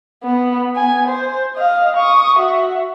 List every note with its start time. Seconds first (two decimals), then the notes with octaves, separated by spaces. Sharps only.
0.24 B3
0.76 B3 G#5
1.08 C5
1.56 D#5 F5
1.97 C#6 D#6
2.39 F#4 E5